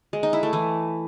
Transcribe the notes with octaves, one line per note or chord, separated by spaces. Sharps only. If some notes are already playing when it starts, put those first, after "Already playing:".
G#3
D#4
E4
A3
E3